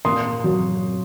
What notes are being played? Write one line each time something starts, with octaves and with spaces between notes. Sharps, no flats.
A#2 C6 D#6
F#3